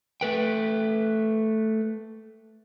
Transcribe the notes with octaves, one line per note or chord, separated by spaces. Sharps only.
A3 B4 G5